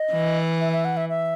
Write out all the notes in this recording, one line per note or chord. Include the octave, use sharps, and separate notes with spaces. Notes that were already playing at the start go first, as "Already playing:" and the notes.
Already playing: D#5
E3
E5
E5
F#5
E5
E5